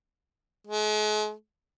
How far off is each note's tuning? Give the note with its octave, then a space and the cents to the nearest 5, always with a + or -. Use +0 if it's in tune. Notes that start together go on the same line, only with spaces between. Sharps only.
G#3 +40